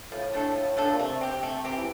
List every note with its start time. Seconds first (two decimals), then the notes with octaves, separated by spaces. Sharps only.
0.12 A2 F3
0.34 A3 D4 A4
0.56 F3
0.77 A3 D4 A4
0.91 A#2
0.99 C3 A3
1.21 C4 G4
1.43 A3
1.65 C4 G4
1.76 E3